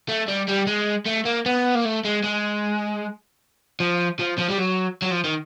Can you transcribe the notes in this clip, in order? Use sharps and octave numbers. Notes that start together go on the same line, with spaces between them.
A3
G3
G3
G#3
A3
A#3
B3
A#3
A3
G#3
G#3
F3
F3
F3
G3
F#3
F#3
F3
D#3